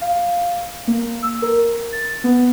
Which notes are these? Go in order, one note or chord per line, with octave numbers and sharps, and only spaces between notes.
F5
A#3
E6
A#4
A6
B3